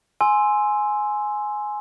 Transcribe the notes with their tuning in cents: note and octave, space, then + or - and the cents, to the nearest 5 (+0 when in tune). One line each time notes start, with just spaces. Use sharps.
G#5 +10 C6 +0 E6 +0